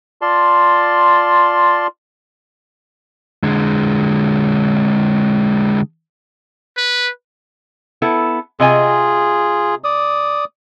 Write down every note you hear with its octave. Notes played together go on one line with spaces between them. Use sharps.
F4 D5 A5 C6
D3 G#3
B4
B3 E4 A4
C3 F4 G#4 D#5 G#5
D5 D#6